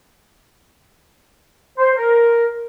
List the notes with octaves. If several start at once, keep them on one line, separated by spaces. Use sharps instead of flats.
C5
A#4